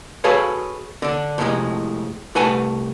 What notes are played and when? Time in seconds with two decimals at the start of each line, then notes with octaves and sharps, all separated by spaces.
0.24 F#4 G#4 A4 B4 C#5 F5
1.02 D3 D4
1.38 F2 A2 C3 D#3 F3 G#3
2.35 C2 A3 B4 F#5 G#5 A5